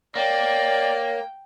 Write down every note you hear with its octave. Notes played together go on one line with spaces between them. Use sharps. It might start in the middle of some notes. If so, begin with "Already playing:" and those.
A#3 C#5 D5 G5